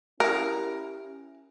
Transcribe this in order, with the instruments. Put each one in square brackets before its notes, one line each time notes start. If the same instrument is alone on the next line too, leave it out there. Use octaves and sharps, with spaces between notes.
[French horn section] C#4 E4 G4 [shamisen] A#4